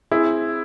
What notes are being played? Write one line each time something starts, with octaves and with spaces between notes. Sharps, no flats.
C4 E4 G#4